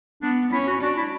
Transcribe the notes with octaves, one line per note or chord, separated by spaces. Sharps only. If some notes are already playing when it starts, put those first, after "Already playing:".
B3 D4
C#4 E4
F#4
D4 F#4
E4